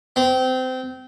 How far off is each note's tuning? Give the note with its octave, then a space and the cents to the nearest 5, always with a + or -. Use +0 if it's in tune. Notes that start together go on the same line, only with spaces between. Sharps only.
C4 -25